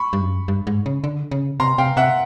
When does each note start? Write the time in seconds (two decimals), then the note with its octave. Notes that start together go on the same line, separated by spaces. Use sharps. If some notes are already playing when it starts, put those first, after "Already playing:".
Already playing: B5 C#6
0.13 G2
0.21 F#2
0.48 G2
0.67 G#2
0.86 C#3
1.04 D3
1.31 C#3
1.60 C3 A#5 C6
1.78 C3 F5 G5
1.97 C3 E5 F#5